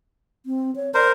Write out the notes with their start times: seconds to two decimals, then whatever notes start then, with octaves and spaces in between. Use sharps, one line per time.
0.46 C4
0.76 C#5
0.94 A#4 C5 D5